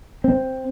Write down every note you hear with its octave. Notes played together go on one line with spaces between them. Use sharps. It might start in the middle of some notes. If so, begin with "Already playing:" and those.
C4